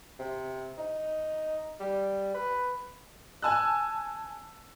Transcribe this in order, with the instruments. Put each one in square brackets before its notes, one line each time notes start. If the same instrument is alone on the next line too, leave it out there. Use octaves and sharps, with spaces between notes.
[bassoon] C3
D#4
G3
B4
[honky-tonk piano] G#5 A5 E6 F#6